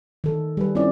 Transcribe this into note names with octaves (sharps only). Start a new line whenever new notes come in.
D#3 A4
G3 G#4 B4
G3 C4 C#4 E4 F4 D5